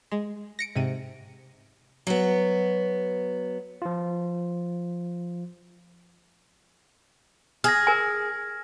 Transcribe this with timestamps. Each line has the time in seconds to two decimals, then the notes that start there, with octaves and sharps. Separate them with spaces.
0.12 G#3
0.59 A#6 C#7 D7
0.75 G#2 C3 D#7
2.07 F#3 B3
3.82 F3 F4
7.64 G#4 F6 G#6 A#6
7.87 A#4 G#5